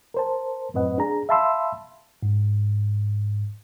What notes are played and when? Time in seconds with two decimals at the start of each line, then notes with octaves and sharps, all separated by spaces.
0.14 A#4 C5 A5
0.74 F#2 A2 C4 B4 D#5 F#5
0.98 D4 G#4 A#5
1.29 E5 F5 A5 B5 C6 E6
2.23 G#2